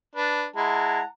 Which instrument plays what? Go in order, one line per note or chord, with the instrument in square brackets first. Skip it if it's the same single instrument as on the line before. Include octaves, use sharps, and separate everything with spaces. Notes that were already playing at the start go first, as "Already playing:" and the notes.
[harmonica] D4 B4
[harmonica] G#3 E4 [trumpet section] F#5 A5 A#5